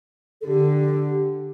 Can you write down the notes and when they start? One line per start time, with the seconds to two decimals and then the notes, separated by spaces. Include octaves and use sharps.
0.41 A4
0.46 D3 G4